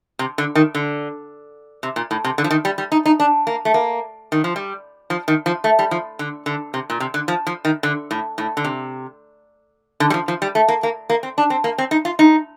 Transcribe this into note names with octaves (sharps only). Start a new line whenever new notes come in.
C3
D3
D#3
D3
C3
A#2
A2
C3
D3
F3
D#3
G3
G3
D#4
D#4
D4
A#3
A3
A#3
D#3
F3
G3
F3
D#3
F3
A3
G3
F3
D3
D3
C3
A#2
C3
D3
F3
F3
D#3
D3
A2
A2
D3
C3
D3
G3
F3
F3
G3
A3
A#3
A#3
A#3
C4
D4
C4
A#3
C4
D#4
F4
D#4